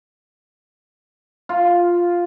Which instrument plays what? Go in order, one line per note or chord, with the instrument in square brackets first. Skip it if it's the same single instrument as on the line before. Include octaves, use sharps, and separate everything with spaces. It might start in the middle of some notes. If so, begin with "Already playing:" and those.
[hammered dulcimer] F4